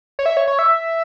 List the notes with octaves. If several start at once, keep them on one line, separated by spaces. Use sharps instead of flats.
C#5
E5
C#5
C#5
E5